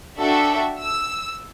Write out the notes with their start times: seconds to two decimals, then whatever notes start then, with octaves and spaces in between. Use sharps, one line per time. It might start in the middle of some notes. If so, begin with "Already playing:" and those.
0.19 D4 F#4 A4 E5 G5
0.80 E6